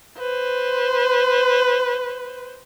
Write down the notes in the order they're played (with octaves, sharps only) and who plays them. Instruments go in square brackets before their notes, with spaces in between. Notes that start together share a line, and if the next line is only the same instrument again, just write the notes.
[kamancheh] B4 C5